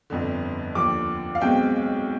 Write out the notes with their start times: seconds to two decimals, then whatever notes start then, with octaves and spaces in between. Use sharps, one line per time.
0.10 G1 F2 D3
0.75 D#2 D3 F3 D6
1.35 F5
1.41 B1 B2 G#3 C4 G5